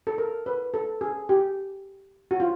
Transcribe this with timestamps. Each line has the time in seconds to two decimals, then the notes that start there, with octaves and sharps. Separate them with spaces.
0.07 A4
0.18 A#4
0.46 B4
0.74 A4
1.01 G#4
1.29 G4
2.31 F#4
2.40 F4